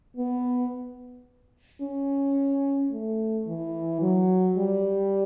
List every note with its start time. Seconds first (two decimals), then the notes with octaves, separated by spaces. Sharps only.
0.17 B3
1.82 C#4
2.92 A3
3.47 E3
4.02 F#3
4.57 G3